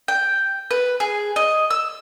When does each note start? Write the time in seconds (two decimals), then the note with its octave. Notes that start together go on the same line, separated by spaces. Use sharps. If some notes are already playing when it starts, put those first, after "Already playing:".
0.08 G5
0.71 B4
1.00 G#4
1.36 D#5
1.71 E6